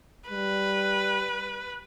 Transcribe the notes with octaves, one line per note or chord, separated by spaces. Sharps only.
G3 B4